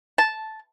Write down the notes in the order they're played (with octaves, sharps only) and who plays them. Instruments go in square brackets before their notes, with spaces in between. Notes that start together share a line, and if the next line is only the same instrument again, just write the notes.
[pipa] A5